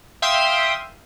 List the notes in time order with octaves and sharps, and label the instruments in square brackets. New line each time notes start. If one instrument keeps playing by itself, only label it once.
[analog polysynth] E5 F5 G5 C6 D#6